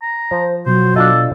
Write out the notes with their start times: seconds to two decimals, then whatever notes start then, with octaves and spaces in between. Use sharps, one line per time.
0.02 A#5
0.31 F3 C5
0.66 B2 F#3 C5
0.96 D4 F4 A4 D#5